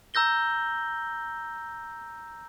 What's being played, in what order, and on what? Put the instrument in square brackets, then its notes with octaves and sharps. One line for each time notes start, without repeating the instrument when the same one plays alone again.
[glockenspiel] A#5 E6 G6 A#6 G7